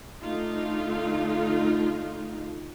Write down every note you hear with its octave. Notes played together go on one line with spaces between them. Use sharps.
D3 A3 D#4 F4